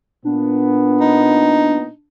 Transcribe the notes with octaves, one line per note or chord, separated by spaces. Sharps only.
A#2 B3 D4
D#4